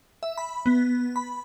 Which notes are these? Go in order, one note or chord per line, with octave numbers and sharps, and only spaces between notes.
E5
B5
B3
B5